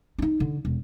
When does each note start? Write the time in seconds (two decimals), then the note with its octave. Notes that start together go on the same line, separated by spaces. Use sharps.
0.18 D4 D#4
0.40 D3
0.65 E1